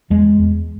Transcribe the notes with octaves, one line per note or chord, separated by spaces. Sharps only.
E2 G#3
E2